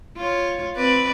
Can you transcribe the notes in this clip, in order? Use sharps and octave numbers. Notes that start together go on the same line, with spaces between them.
F4 C#5
C4 B4 D5